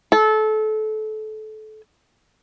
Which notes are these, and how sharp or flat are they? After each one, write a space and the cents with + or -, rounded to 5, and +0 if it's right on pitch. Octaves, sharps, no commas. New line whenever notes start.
A4 -25